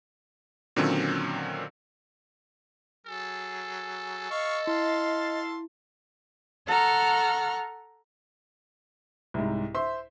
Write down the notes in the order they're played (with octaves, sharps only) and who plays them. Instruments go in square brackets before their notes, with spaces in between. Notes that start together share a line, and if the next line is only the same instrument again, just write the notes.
[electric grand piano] A#2 D3 D#3 F#3 C4 C#4
[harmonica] F#3 G#4 [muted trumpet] A4
[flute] D#5 [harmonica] F5 C#6 [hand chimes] C#7
[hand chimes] E4 [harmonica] F5 A5 C6
[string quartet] A4 F#5 A#5 C#6 F6
[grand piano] C2 G#2
C5 E5 C6